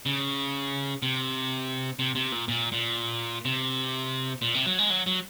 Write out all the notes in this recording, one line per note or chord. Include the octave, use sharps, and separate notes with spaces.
C#3
C3
C3
C3
A#2
A#2
A#2
C3
A#2
C3
F#3
G#3
F#3
F#3